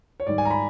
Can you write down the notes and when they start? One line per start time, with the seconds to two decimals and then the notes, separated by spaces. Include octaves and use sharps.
0.20 C#5
0.27 G#2 D#3 G3 D5
0.38 G#5
0.45 A#5
0.51 B5